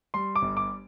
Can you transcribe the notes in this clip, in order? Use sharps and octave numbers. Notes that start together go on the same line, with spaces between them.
G3 C6
D6
G1
D6